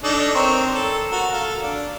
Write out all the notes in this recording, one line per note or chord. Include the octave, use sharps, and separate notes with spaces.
D4 D#4 A4
C4 A#4 C#5
A4
F#4 A#4
A4 F5
D4